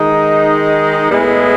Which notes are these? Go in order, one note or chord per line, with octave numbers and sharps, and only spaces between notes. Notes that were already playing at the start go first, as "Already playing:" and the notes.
Already playing: D#3 G#3 D#4
A2 G#3 B3 E4 G#4